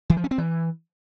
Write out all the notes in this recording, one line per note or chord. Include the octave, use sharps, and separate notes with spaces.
E3
F3
C#4
C4
E3